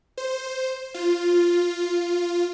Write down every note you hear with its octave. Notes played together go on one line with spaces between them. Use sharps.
C5
F4